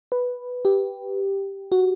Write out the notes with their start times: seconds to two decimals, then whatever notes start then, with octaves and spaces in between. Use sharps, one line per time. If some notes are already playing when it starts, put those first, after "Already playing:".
0.12 B4
0.65 G4
1.72 F#4